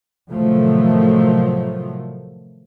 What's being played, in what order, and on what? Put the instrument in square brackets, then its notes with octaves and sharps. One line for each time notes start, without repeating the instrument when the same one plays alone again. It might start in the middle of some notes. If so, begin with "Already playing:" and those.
[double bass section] A2 C3 D#3 F3 F#3 A3